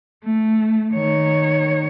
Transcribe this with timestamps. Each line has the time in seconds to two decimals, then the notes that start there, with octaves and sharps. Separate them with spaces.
0.24 A3
0.93 D#3 C#5